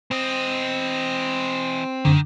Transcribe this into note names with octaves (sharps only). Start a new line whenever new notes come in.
E3 C4 D#5
F#2 D3 D#3